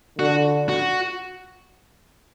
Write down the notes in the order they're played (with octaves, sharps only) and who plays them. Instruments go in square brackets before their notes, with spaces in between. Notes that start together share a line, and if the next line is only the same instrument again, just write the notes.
[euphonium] D3 [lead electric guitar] F#4
[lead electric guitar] F#4